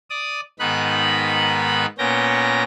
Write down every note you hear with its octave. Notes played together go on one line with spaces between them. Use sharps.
D5 D#6
G#2 D#3 B3 D#4 B5 F#6
A#2 B3 C#4 G5 A#6